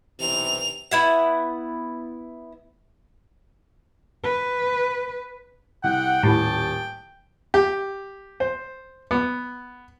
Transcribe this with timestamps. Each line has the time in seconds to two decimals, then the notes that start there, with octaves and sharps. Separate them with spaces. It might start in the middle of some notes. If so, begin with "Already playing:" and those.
0.20 B1 C3 E3 F7
0.91 B3 E4 F#5
4.24 B4
5.84 C2 F#5 G5
6.23 D#1 A2 G4 C#5 A5
7.54 G4
8.40 C5
9.11 B3